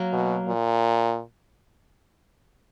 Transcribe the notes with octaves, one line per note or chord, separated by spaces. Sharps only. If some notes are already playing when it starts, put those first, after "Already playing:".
Already playing: F#3 A#3
B2
A#2